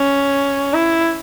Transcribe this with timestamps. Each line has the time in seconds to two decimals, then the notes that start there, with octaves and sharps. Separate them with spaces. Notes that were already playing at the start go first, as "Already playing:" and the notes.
Already playing: C#4
0.73 E4